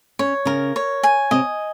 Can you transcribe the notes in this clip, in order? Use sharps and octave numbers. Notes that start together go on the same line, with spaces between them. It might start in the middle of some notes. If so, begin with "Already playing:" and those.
C#4 C#5
C#3 C#4 A#4
C#5
G#5
C3 C4 D#5